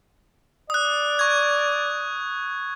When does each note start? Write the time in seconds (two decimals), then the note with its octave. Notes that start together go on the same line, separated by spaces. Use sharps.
0.70 D5 D#6 F#6
1.19 C#6 G#6